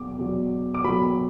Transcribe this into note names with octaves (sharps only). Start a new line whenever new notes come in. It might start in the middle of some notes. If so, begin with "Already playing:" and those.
Already playing: E2 B2 F#3 D6
E2 B2 F#3
D6
E2 B2 F#3 B5